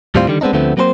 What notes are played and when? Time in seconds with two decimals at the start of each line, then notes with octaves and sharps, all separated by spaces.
0.15 D#2 A2 G3 C4 F4
0.28 D3 D#3 G3
0.41 G#3 B3 C4 D4 D#4
0.53 D2 D3 F3 A3 B3 C4
0.77 F#3 A#3 C4 A#4 C5